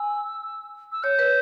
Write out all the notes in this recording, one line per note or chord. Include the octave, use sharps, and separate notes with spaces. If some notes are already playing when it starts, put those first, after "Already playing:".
Already playing: G#5 E6
E6
C#5 G6
B4